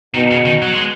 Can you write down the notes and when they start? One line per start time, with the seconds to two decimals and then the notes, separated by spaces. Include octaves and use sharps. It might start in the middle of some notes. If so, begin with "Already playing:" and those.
0.15 B2 D#3
0.31 C#3
0.46 D#3
0.62 F#3
0.73 G#3